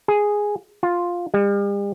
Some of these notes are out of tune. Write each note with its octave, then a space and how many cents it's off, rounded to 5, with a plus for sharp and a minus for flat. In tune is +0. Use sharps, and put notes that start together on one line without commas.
G#4 -5
F4 +5
G3 +45